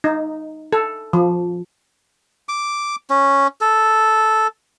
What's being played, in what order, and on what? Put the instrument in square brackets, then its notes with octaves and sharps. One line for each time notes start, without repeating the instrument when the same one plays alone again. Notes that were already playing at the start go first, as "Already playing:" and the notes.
[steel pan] D#4
A4
F3
[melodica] D6
C#4
A4